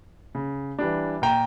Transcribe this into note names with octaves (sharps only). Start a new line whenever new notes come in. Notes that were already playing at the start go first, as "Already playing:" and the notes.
C#3
E3 G3 D4
A#2 G5 A#5